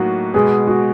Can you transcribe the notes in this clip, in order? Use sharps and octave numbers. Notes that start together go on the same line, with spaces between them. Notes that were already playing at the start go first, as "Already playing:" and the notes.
Already playing: A2 F#3 A#3 D#4 F#4
B2 G#3 B3 G#4
F#4